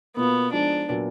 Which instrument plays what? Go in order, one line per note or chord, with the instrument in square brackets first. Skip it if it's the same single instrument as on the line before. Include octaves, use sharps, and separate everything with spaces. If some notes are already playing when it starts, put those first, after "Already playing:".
[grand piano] B2 A#3 F4 [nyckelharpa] B3
[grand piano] F3 G#3 D#4 [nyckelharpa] D4
[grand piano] A#2 F#3 B3